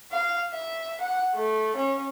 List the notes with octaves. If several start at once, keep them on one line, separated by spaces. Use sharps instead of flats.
F5
E5
F#5
A3
C#4